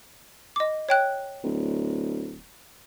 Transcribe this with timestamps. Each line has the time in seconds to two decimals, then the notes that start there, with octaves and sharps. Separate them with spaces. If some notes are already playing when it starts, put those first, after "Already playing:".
0.56 D#5 D6
0.89 C#5 G5 F#6
1.44 D1